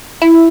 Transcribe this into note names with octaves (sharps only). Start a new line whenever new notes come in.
E4